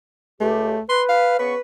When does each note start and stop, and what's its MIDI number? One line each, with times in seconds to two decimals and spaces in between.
0.41 0.76 37
0.41 0.81 57
0.41 0.76 67
0.89 1.37 71
0.89 1.03 84
1.09 1.34 77
1.39 1.54 49
1.39 1.54 59
1.39 1.60 71
1.39 1.54 85